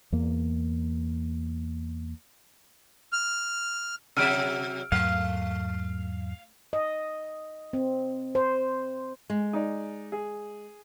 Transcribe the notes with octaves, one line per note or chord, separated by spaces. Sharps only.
E2 A#3
F6
C3 F#3 E5 E6 F6 D7
E2 G#2 F#3 A3 F5
D#5
C4
C5
G#3
D#4 D5
G#4